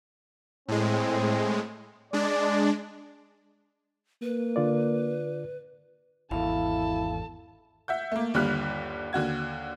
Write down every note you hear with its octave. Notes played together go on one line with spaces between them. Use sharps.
A2 G#3 C4
G#3 D4 D5
A#3 B4
D3 F4 D5
G#1 E2 E4 A4 F5 A5
E5 F#5 G6
A3 A#3
G1 D#2 D3 G3 F6 F#6
D#2 D3 F#4 G#6